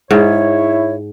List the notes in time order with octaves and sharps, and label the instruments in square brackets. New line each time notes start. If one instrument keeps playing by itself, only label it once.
[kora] G#2 [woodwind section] E4 C#5